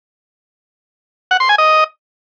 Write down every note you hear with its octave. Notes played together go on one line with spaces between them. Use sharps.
F#5
C6
G#5
D#5